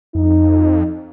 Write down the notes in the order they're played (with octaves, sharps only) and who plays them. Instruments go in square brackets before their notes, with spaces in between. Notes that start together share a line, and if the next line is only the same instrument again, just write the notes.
[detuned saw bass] F2 [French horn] D#4